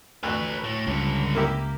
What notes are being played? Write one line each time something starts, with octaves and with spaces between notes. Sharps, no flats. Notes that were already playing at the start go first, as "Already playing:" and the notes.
D2 A4 B4 F#6
A2
C#2 G2 D3
A#3 E4 G4